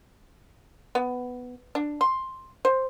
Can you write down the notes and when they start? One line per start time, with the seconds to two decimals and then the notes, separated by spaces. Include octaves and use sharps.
0.95 B3
1.75 D4
2.01 C6
2.65 C5